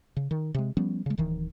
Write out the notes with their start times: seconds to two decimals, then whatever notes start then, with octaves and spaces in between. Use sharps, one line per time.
0.17 C#3
0.31 D#3
0.54 C3 G#3
0.77 F3 G3 B3 C#4
1.06 C#3 G#3
1.18 D1 D#3 E3